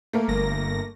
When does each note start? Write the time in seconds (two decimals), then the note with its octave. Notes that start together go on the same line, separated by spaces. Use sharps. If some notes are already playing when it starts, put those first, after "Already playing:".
0.13 A3 A#3 A#4
0.28 G1 A#6